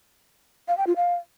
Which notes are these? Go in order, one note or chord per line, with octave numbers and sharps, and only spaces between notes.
F5
G5
F4
F5